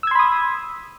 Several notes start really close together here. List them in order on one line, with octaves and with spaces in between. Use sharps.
E6 G#6 C6 B5 D#6